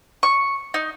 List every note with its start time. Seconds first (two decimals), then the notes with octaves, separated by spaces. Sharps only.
0.23 C#6
0.74 D#4